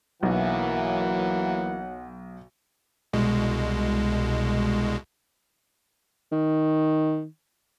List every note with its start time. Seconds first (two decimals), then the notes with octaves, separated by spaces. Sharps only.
0.23 B1 E3 F#3 A#3 F#5
3.13 C2 B2 G#3
6.32 D#3